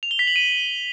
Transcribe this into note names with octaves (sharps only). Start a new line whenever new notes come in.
F7
G7
B6
F#7
D#7